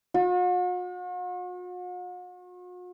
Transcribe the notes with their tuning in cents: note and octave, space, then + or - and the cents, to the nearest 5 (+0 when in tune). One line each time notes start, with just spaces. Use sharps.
F#4 -45